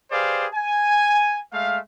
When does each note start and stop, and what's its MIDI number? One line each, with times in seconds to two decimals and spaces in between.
0.12 0.47 67
0.12 0.47 68
0.12 0.47 71
0.12 0.47 72
0.12 0.47 74
0.12 0.47 77
0.54 1.40 80
1.52 1.79 56
1.52 1.79 57
1.52 1.79 76
1.52 1.79 77